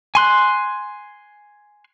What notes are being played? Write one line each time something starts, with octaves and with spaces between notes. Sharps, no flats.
G#5 C6 F#6